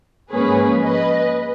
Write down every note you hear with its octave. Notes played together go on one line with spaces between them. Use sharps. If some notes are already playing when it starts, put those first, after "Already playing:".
G#2 F3 A#3 C#4 G#4 B4
B4 D#5